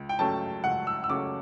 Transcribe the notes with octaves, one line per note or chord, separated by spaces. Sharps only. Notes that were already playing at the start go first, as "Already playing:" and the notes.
Already playing: C#2
G5
C#3 F#3 A3 C#4 A5
C#2 F#5
E6
E6
C#3 F#3 A3 C#4 D6